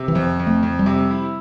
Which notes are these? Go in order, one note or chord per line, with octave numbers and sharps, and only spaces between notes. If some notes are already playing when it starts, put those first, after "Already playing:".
Already playing: C3
E3
F2 F3
F2
A3
F2
G3
C3
E4